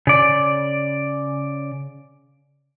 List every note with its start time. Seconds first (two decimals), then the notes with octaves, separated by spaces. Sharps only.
0.07 C#3 D5